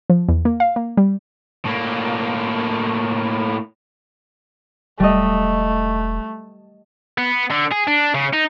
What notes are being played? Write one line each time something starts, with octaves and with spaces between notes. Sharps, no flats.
F3
E2
A#3
F5
A#3
G3
A2 A#3
E1 G3 A3 D#5
B3
D3
G#4
D4
C#3
D#4